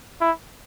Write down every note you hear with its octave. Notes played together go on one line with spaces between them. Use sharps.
E4